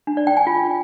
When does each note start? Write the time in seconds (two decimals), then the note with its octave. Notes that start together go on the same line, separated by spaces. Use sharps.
0.07 D4
0.17 D5
0.27 G5
0.37 G#5
0.47 F4